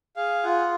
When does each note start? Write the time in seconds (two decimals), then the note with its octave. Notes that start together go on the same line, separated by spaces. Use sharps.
0.16 G#4 F5
0.43 F4 F#5